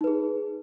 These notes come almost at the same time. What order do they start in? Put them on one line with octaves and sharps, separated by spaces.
D#4 B4 G#4